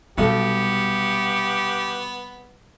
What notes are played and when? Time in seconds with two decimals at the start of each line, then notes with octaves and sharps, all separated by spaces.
0.18 B1 C3 G3 B3 G4 A4